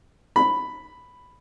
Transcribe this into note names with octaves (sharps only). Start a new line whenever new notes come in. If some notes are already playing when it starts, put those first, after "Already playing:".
B5